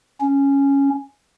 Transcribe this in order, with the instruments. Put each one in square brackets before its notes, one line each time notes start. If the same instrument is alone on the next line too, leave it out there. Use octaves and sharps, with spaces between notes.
[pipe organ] C#4